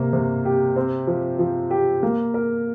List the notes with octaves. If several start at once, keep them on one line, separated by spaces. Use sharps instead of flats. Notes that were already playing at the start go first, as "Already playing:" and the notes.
Already playing: C3 A#3
C3
G4
C4
F3
F3
G4
A#3
A#4